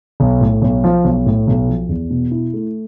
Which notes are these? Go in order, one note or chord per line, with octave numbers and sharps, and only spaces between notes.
B1
A2
B1
F3
B1
A2
B1
F3
E2
B2
E4
A3